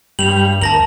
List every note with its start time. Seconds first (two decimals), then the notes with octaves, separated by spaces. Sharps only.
0.19 G2 G3 F7 F#7
0.62 D2 A#4 A5 A#6 F#7